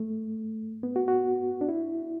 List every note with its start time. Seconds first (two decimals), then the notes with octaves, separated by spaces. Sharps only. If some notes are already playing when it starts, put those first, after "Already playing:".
Already playing: A3
0.83 B3
0.96 F#4
1.08 F#4
1.61 D4
1.69 E4